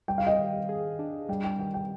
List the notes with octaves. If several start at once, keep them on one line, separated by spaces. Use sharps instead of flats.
G3 G5
F5
D#5 G5
D#3
G#4
D4
G3 G5
G5
D#3 G5
G5